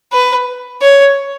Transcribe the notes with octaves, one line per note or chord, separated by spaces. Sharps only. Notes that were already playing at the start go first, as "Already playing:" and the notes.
B4
C#5